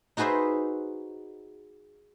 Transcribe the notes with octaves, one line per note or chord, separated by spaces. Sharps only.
D#4 F#4 G#4 B4 C5 E5